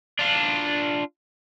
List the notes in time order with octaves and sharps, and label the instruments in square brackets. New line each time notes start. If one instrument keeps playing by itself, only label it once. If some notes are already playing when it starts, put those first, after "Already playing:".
[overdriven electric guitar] D4 F4